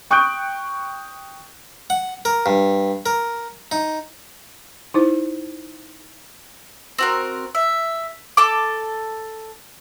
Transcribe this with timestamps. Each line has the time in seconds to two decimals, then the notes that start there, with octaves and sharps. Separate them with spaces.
0.10 G5 C#6 D#6 F#6 G6 D7
1.90 F#5
2.25 A#4
2.46 G2
3.06 A#4
3.72 D#4
4.94 D#4 E4 C5
6.98 C4 F#4 A#4
7.55 E5
8.37 A4 A5 D6